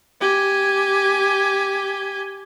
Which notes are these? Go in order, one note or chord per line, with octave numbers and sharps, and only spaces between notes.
G4 G#5